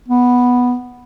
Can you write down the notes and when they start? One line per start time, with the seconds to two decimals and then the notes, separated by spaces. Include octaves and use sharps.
0.08 B3